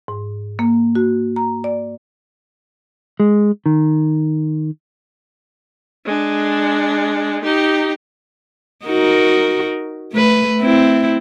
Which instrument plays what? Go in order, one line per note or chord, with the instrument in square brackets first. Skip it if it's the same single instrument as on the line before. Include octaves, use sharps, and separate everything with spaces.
[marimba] G#2
A#3
F#4
A#5
D5
[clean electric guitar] G#3
D#3
[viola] G#3 D4
D#4 G4
[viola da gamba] D#4 F#4 A#4
A3 B4
C4 E4